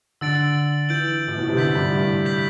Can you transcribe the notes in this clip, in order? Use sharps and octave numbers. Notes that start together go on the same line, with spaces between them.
D3 E6 A6 D7 F#7
E3 G6 D7 F#7
A2
B2
C3
D3 G6 B6 F#7
G2
A2
G6 B6 F#7